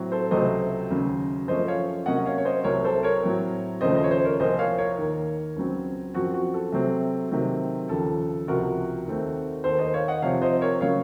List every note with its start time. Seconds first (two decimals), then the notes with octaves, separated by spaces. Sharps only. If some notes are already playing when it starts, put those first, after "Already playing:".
Already playing: A2 F#3 C4
0.12 A4 C5
0.31 C#2 C3 F#3 A3 C4 C5 D#5
0.90 D#2 C#3 F#3
1.48 F#2 F3 A3 C#4 C5 D#5
1.68 C#5 F5
2.06 C3 F#3 A#3 C#4 D#5 F#5
2.17 D#5
2.25 C#5 F5
2.38 C#5
2.45 C5 D#5
2.64 C2 C3 F#3 A#4 C#5
2.84 A4 C5
3.03 A#4 C#5
3.23 A2 F#3 C4
3.81 D#2 C#3 F3 A3 C5 D#5
3.96 C5 D#5
4.04 C#5
4.10 C5 D#5
4.25 A#4 C#5
4.40 C2 A#2 F3 A#3 C5 D#5
4.59 C#5 F5
4.78 A#4 C#5
4.98 D#2 D#3 A#3
5.56 C#2 C#3 F#3 C4
6.14 F#2 F3 C4 F#4
6.34 F#4
6.54 A4
6.72 C3 F#3 A3 C4
7.31 C3 D#3 F#3 C4
7.89 D#2 C#3 F3 A4
8.47 C#2 C3 F3 F#4 A#4
9.06 D#2 D#3 A3 C4
9.64 D#2 D#3 A#3 A4 C5
9.79 C5 D#5
9.94 C#5 F5
10.08 D#5 F#5
10.22 C3 F3 C4 C#5 F5
10.42 C5 D#5
10.61 A#4 C#5
10.81 C#3 F#3 A#3 C#5 F5